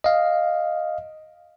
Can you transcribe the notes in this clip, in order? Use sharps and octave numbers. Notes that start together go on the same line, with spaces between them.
D#5 F5